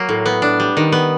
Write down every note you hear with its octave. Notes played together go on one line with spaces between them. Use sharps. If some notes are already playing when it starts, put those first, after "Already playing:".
Already playing: F#3 A#3
A2
B3
D4
G3
D#3
B3